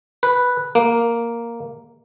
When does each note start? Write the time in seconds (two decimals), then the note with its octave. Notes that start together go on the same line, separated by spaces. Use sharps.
0.23 B4
0.75 A#3